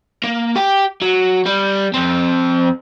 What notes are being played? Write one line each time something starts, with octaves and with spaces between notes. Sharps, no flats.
A#3
G4 G5
F#3
G3
F2 C4